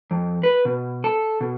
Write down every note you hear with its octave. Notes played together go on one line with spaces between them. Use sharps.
F2
B4
B2
A4
B2